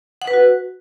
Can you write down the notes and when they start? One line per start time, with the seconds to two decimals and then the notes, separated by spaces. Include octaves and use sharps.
0.22 F#5
0.27 B4
0.33 F#4